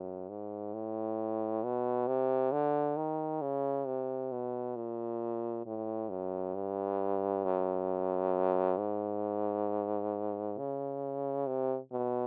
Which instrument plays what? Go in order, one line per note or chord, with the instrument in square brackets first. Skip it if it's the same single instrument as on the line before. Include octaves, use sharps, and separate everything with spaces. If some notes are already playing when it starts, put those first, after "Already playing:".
Already playing: [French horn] F#2
G#2
A2
B2
C3
D3
D#3
C#3
C3
B2
A#2
A2
F#2
G2
F#2
G#2
C#3
C3
B2